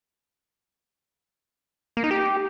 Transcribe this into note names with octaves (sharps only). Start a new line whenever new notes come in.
A#3
D#4
G4